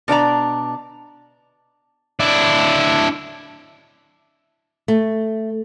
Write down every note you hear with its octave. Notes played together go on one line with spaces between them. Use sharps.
B2 D4 D5 A#5
D4 E4
A3